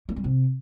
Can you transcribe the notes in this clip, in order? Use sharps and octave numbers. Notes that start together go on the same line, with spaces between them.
A#3
G3
C3